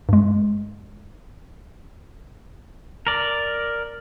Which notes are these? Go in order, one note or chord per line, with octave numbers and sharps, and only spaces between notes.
G2 G#3
A#4 D5